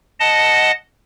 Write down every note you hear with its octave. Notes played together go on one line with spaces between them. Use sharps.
D#5 F#5 A5